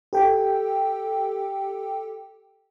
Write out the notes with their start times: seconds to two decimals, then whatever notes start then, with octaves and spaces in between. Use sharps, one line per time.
0.13 G4 A4 G5